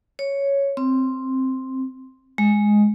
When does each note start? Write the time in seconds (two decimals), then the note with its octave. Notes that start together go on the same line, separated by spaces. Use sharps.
0.19 C#5
0.77 C4
2.38 G#3